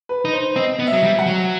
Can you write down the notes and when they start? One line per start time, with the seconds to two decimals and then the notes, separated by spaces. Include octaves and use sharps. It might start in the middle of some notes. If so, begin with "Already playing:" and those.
0.09 B4
0.25 D#4
0.33 C5
0.56 C4 D#5
0.79 B3
0.87 E5
0.93 F#3
1.03 G3
1.19 F#5
1.26 F#3